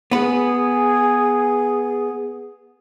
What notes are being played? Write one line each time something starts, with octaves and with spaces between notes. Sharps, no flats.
B3 G#4 B4